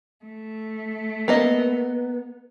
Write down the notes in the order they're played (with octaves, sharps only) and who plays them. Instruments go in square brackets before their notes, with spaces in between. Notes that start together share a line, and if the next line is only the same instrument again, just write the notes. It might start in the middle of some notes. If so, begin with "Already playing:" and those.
[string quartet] A3
[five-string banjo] A#3 A#4 D#5 [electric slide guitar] B3